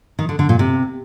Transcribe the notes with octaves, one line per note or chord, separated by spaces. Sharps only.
D#3
D3
D3
A#2
C3